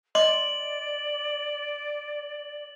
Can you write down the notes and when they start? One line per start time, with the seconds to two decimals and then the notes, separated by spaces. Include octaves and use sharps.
0.15 D5 D#5 C6 D6 F#7